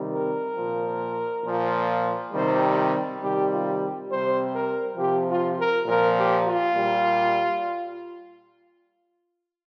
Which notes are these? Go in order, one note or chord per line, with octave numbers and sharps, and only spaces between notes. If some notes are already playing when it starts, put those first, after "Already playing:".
Already playing: C3 D#3 G3
A#4
A#2 F3
A#2 F3
C3 D#3 G3 C5
C3 D#3 G3 G4
F4
G4
C3 G3 C5
A#4
C3 F3 G4
F4
A#4
A#2 F3 A#4
G4
F4
A#2 G3